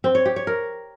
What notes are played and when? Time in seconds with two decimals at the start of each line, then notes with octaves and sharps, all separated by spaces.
0.04 C4
0.15 C#5
0.26 G4
0.36 C#5
0.47 A#4